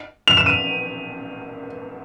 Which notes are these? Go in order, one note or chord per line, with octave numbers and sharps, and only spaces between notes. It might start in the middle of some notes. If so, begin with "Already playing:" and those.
F7
E7
D#7